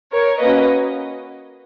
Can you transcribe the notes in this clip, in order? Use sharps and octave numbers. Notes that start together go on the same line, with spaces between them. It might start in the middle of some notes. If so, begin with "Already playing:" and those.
A#4 C#5
A#3 C#4 F#4 B4 D#5